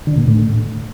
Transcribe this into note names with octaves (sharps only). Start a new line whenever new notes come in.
D3
A#2
A2